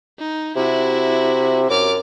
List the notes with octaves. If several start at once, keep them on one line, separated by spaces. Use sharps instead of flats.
D#4
C3 E4 F#4
F#2 D6 F6